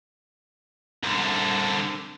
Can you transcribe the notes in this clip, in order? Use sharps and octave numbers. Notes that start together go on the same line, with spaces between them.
C2 D3